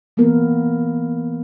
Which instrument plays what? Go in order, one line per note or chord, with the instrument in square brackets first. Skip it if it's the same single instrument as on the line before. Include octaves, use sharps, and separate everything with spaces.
[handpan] E3 A#3 B3 A#4